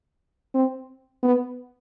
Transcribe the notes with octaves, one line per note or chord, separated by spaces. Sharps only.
C4
B3